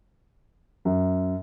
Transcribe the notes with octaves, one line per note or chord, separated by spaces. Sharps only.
F#2